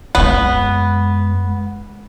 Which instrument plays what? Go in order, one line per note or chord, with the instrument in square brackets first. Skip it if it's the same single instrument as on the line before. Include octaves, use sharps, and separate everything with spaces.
[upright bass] F#2 G#3 [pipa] B3